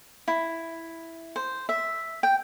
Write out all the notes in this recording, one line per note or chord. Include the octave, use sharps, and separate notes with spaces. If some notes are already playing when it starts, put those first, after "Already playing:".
E4
C5
E5
G5